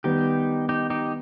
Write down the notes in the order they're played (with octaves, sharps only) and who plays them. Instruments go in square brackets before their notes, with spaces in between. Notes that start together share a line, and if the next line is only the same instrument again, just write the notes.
[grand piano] D#3 G3 B3 [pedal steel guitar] D#4 G4
[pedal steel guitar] D#4 G4
D#4 G4